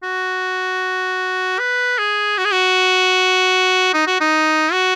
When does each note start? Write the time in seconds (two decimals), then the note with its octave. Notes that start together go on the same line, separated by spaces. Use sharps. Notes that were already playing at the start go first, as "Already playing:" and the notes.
0.03 F#4
1.59 B4
1.98 G#4
2.38 F#4
2.45 G#4
2.52 F#4
3.94 D#4
4.07 F#4
4.20 D#4
4.72 F#4